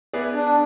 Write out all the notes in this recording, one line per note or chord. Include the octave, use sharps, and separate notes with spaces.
B3 E4 G#4 B4 D5
D4